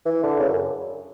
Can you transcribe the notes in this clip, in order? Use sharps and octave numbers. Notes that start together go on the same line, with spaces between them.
E3
D3
C#3
F#2